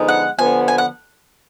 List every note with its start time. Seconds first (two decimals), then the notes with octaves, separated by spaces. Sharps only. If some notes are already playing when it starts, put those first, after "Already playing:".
Already playing: D3 F3 G#3 B3 D#4
0.08 F#5
0.38 D3 F3 B3 G#5
0.68 G#5
0.78 F#5